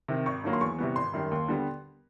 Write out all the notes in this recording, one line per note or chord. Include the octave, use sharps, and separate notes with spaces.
C3 D#3
G#1 C#6
G2 D#3 F#3 A#3
C6
E2 C#6
C3 E3 G3 B3
G#1 C6
F#2 D#3 G3
D#2
D3 G3 B3